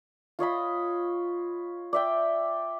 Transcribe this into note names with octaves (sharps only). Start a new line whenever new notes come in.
F4 C#5 D#5 B5
D5 E5 G5